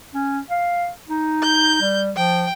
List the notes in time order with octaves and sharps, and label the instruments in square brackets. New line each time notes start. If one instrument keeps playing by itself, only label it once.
[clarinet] C#4
F5
D#4
[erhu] G6
[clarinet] G3
[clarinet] F3 [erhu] G5